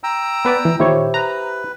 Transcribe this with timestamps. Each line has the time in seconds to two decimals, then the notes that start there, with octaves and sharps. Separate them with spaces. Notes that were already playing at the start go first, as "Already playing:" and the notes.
0.03 G5 A#5 E6
0.45 B3 B4 D5
0.65 E3
0.80 A#2 D#3 E4 G4 C5 C#5
1.14 B4 A#5